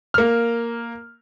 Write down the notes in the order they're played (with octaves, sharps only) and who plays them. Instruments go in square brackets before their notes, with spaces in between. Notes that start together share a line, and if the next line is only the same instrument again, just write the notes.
[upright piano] A#3 F6